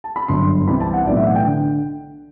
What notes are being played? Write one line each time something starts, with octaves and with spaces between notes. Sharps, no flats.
A5
B5
G1 F#2 D3 C6
C2 C3 E3 B5
A5
F#5
B1 A2 E3 D5
E5
F#5
G5
D3